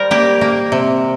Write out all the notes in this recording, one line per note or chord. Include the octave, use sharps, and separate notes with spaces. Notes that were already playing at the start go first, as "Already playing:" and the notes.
Already playing: G3 A#4 C5
A#3 G4
A#3
C3